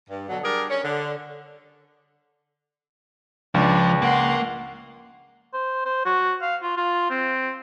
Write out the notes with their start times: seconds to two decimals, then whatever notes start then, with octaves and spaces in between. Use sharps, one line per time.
0.08 G2
0.29 B2 D3 F#3
0.44 G3 D4 G#4 A#4
0.69 C#4
0.83 D3
3.54 C#2 F3 D4 B4
4.02 A#3 F#5 C6
5.53 C5
5.85 C5
6.05 F#4
6.42 F5
6.62 F4
6.77 F4
7.10 C4